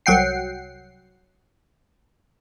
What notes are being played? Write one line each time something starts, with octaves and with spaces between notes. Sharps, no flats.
C2 F#3 F#5 G5 C7